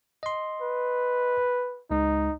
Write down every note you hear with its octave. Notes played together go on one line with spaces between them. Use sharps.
D#5 C6
B4
C#2 G#3 D#4